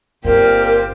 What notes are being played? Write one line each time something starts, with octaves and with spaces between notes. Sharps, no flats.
G1 A#2 C4 G4 A#4